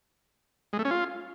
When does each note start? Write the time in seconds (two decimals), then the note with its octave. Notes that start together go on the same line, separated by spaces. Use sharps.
0.73 G#3
0.79 A3
0.85 C#4
0.91 F4